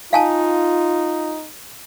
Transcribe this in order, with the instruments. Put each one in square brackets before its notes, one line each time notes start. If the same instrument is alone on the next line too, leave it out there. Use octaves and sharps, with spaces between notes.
[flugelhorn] D#4 [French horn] F4 [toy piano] F5 G#5 A5